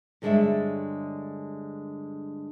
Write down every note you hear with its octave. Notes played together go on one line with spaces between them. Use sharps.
G2 D3 G#3 D4 C#5 E5